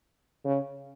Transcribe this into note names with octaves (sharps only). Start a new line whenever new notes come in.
C#3